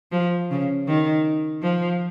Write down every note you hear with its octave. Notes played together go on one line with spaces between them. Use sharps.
F3
C#3
D#3
F3